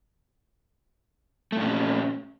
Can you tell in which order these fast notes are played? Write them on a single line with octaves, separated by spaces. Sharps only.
A3 A#2 C#4